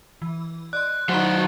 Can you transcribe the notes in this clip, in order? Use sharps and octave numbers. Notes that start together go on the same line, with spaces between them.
E3
D5 D#5 C6 F#6
F#3 D#4 E4 F#4 C5 B5